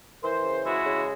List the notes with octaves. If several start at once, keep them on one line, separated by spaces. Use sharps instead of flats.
E3 A#4 C5
C#3
G#3 E4 F#4
C#3